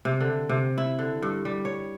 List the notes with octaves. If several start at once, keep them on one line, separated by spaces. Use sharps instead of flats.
C3
D3
C3
E4
D3
G2
G3
C#5